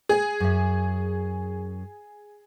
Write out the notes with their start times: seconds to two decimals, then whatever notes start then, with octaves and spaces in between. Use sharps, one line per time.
0.09 G#4
0.40 F#2 E5